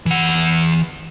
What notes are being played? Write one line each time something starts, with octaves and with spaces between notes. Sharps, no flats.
E3 F#5